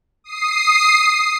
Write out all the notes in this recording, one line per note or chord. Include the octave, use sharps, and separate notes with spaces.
D#6 C7